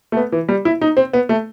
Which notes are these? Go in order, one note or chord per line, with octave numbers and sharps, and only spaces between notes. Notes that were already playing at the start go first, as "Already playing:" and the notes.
A3
B3
E3
G3
E4
D#4
C4
B3
A3